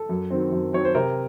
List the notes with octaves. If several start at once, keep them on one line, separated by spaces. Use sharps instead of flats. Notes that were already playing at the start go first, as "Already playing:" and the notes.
Already playing: A4
F#2
D#3 F#3 C4
F#2
D#3 F#3 C4 C#5
C5
C3 A#4